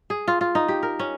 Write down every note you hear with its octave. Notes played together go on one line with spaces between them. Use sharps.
G#4
F4
F4
D#4
G4
A#4
C#4